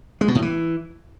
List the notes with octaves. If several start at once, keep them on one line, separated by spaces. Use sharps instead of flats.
G#3
B2
A2
E3